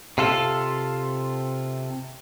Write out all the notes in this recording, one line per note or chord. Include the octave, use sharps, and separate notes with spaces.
C3 F4 A4